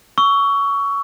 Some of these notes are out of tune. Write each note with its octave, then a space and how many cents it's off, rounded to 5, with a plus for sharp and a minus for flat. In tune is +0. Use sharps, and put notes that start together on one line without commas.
C#6 +20 E6 +0